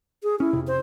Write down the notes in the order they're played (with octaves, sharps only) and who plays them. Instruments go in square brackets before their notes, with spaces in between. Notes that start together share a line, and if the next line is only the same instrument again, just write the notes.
[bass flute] G#4
[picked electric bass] C#4 [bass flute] E4
[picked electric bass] F2 C3
[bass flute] C5